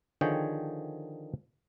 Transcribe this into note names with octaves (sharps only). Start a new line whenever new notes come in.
D3 D#3 F3 G#4 C#5 G5